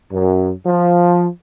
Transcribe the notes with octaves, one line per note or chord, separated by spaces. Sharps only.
F#2
F3